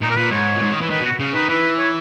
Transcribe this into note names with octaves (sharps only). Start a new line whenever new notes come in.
A#2 D#4
A#4
A#2 B4
G#2 C#5
A#2
G#2
D#3
E3
D#3 B4
B2
F#4
C#3
D#3 B4
E3 B4
C#5